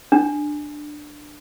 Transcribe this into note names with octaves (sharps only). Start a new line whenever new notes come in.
D4